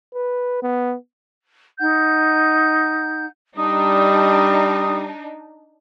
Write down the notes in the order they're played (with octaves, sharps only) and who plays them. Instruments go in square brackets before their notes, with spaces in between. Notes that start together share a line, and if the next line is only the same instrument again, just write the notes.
[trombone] B4
B3
[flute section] D#4 F#5 G6
[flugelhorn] G3 [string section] D4 D#4 [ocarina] D#6